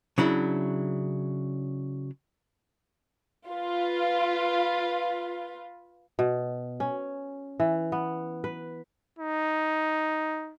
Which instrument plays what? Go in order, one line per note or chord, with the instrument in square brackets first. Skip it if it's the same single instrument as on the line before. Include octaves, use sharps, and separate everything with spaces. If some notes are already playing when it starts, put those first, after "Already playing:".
[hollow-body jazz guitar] C#3 F#3 D4 E4
[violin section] F4 B4
[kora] B2
C#4
E3
B3
B4
[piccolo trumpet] D#4